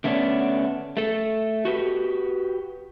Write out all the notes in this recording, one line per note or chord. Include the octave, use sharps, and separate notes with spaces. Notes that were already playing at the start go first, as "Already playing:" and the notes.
D3 A3 B3 C#4 D4
A3 A4
F#4 G4 B4